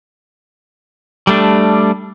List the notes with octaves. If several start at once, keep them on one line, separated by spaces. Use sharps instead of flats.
G3 A3 D4